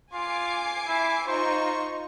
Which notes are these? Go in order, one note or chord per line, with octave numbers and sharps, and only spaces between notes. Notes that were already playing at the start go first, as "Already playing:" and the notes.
F4 G#5 D6 C7
E4
D#4 F4 C5 C#6